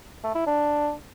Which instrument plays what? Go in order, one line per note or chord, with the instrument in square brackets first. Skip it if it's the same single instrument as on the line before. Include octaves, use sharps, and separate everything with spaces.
[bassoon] A3
E4
D4